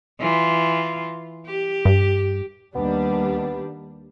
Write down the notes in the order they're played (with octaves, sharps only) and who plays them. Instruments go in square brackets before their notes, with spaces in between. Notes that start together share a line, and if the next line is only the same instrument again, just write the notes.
[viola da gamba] E3 F4
G4
[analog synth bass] G2
[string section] D#2 G3 D4 [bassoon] B3